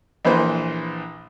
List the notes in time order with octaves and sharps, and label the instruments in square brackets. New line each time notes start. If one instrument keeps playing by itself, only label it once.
[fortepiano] A#1 A#2 E3 B4 C5